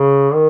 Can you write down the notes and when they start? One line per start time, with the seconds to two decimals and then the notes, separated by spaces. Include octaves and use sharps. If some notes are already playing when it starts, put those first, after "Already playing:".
Already playing: C#3
0.34 D#3